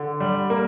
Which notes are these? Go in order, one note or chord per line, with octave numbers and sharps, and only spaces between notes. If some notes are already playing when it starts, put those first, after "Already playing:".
Already playing: D3
G3
A#3